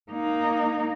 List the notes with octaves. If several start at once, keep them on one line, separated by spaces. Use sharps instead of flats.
A#3 D#4